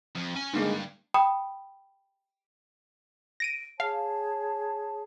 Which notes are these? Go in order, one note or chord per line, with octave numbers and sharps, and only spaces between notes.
F2
C#4 G#5
G2 D3 D#3 G#3 A#3
G5 B5 D#6
A#6 D7 D#7
G#4 C#5 F5 A5